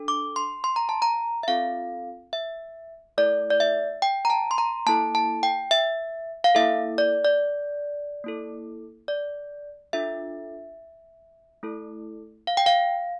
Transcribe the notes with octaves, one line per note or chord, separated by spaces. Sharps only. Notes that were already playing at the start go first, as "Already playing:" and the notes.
Already playing: D4 A4
D6
C6
C6
A#5
A5
A#5
E5
C4 F4 A4 F5
E5
A3 E4 A4 D5
D5
E5
G5
A#5
A5
C6
A#5
A#3 E4 A4 A5
A5
G5
E5
F5
A#3 E4 A4 E5
D5
D5
A#3 E4 A4
D5
D4 F4 A4 E5
A3 E4 A4
F5
G5
F5